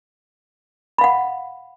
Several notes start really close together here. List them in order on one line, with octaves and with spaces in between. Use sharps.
B5 F5 F#5